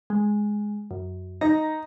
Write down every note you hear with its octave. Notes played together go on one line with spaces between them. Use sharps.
G#3
F#2
D#4 A#5